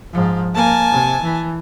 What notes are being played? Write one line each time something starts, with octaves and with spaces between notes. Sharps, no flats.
G#2 F3
A#3 G#5 A5
C3
E3